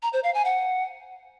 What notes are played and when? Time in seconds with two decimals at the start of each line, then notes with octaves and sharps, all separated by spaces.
0.03 A#5
0.13 C5
0.24 F5
0.34 G#5
0.45 F#5